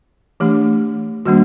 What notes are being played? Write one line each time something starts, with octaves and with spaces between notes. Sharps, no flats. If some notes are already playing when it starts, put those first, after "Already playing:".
E3 A3 D4 G4
D#3 G3 A#3 D4 F#4